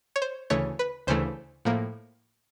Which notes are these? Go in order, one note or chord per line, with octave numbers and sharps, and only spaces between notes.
C#5
C5
D2 C#3 E3 A3 C#5
B4
D2 C#3 E3 A3 C5
A2 F3 A#3